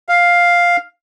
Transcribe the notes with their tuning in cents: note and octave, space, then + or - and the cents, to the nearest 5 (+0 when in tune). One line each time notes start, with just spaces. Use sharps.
F5 +5